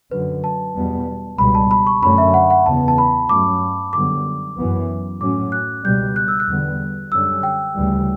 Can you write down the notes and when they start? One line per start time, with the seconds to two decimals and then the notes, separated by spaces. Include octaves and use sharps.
0.11 F#2 D3 F#3 B4
0.44 A5
0.75 E2 B2 G3 B3
1.38 C#2 B2 G3 B5
1.55 A5
1.71 B5
1.87 C#6
2.02 F#2 D3 A3 C#4 B5
2.18 E5
2.34 F#5
2.50 F#5
2.66 E2 C#3 E3 B3 A5
2.88 A5
2.98 B5
3.29 G2 F#3 A3 C#4 D6
3.93 F#2 D3 G3 B3 D6
4.57 F#2 E3 B3
5.20 A2 F#3 C#4 D6
5.52 F#6
5.84 C#2 B2 G3 G6
6.16 F#6
6.28 E6
6.40 F#6
6.48 E2 D3 G3 B3
7.11 F#2 D3 G3 C#4 E6
7.43 G5
7.75 D2 C#3 E3 G3